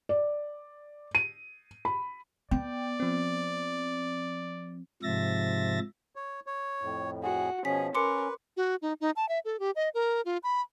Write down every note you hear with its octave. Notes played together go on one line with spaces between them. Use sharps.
D5
D#7
B5
B3 D5 G5
F3 C4
G#2 C3 F3 E5 A6 A#6
C#5
C#5
F2 A2
F#4 G#4
B2 F3 C#4 G#4 B6
C#4 A#4 B4 C6 D6 C#7
F#4
D#4
D#4
A5
E5
A4
G4
D#5
A#4
F4
B5